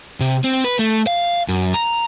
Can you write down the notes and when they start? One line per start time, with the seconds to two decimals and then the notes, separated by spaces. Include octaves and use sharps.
0.20 C3
0.44 C4
0.64 B4
0.79 A3
1.07 F5
1.49 F#2
1.74 A#5